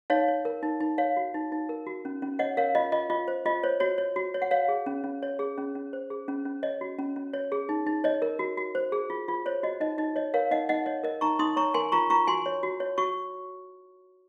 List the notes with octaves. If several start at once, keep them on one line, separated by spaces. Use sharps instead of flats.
D#4 C#5 F5
C#5
A#4
D#4
D#4
C#5 F5
F#4
D#4
D#4
A#4
F#4
C#4
C#4
C#5 D#5 F#5
A#4 C#5 F5
F4 D#5
F4 D#5
F4 D#5
C5
F4 D#5
C5 C#5
F#4 C#5
C#5
F#4
C#5
F#5
C#5 F5
G#4
C#4
C#4
C#5
G#4
C#4
C#4
C5
G#4
C#4
C#4
C#5 D#5
F#4
C#4
C#4
C#5
G#4
D#4
D#4
C#5 D#5
A#4
F#4
F#4
C5
G#4
F4
F4
C5 C#5
F#4 D#5
D#4 D#5
D#4 D#5
C#5 D#5
A#4 C#5 F5
D#4 D#5 F#5
D#4 D#5 F#5
C#5 D#5
A#4 D#5
D#4 A#5 C#6
D#4 C6 D#6
C#5 A#5 C#6
A#4 G#5 C6
F4 A#5 C#6
F4 A#5 C#6
F#4 G#5 C6
C#5
F#4
C#5
F#4 C#6